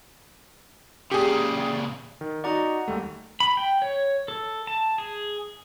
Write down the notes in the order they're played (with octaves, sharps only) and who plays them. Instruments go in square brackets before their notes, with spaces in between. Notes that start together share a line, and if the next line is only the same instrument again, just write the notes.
[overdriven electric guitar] A#2 C#3 [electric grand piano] G4 G#4
[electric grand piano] D#3
[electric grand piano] D#4 F#4 D5 [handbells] F#5 A#5
[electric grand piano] D#2 G3 A3
[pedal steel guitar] B5
G5
C#5
A4
A5
G#4